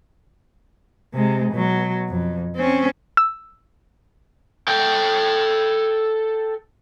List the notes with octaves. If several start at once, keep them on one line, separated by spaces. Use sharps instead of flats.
C3 G#3
B2 F#3
F2
C4 C#4
E6
A4 G5